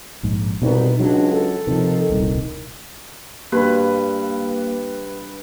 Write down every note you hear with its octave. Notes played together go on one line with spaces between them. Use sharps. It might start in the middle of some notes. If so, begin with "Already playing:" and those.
A#1 G#2
C2 B2 B3 D#4
C#2 F#3 D4
A4
C3 D#3 F3
D#1 C2
G2 A#3 G4 B4